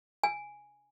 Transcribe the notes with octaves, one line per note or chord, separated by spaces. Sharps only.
G#5